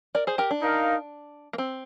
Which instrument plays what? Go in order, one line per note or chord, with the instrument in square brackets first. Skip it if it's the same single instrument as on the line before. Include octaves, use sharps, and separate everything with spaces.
[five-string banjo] A#4 D5
G#4 C5
G4 A#4
D4
[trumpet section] D#4 A#4 F5
[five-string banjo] A#3
C4